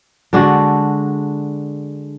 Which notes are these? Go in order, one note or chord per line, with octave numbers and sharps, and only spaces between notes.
D3 G#3 D4 F#4